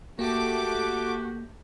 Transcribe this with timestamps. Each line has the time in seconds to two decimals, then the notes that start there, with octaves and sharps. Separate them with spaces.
0.19 A3 A#3 F#4 G4 D6